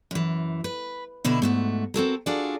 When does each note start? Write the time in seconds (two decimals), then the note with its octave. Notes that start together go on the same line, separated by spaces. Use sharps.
0.11 F#2 E3
0.64 B4
1.25 B2 D3 E4
1.42 G#2 A3 F#4
1.94 C4 F#4 A4 A#4
2.26 D4 F4 F#4 G#4 A4 D5